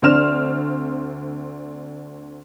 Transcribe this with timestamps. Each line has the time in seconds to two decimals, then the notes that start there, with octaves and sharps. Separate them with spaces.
0.02 D2 C4 D4 F6 E7